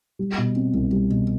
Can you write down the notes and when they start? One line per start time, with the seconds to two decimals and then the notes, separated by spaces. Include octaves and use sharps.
0.19 G3
0.38 B2
0.56 C4
0.74 C2
0.92 G3
1.10 B2